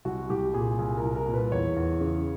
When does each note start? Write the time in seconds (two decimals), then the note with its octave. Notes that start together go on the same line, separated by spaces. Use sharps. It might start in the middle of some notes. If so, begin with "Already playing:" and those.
0.05 C2 F#4
0.30 C2 G4
0.54 A#2 G#4
0.79 C2 G#4
0.97 A#4
1.03 C2
1.15 A#4
1.27 A#2
1.34 B4
1.52 E2 C#5
1.76 E2
2.01 C#3